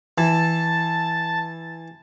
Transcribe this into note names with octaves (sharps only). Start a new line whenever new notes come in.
E3 A5